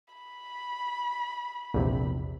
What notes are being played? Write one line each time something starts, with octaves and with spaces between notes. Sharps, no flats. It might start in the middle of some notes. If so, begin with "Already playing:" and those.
B5
A#1 E2 C3